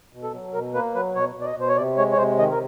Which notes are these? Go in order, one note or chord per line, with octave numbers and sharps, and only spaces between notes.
B2
A4
F#3
B2 A#4
A#3 B4
F#3 B4
B2 C#5
B2
D5
D#5
B2 C5
C#5
C3 D5
G#3 C#5
C#5
C3 C5
D#3 D#5
A#4